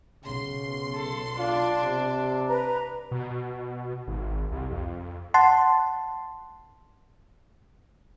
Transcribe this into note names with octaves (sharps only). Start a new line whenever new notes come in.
B1 C#3 C6
A4
D4 F4
C3
B4 A#5
B2
G#1
C2
F2
F#5 A5 C6